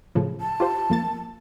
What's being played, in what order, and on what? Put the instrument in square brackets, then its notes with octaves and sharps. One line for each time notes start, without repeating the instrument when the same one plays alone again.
[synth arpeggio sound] A2 C#3 F3
[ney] A5
[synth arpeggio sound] F4 G4 C5
F2 A#3 A6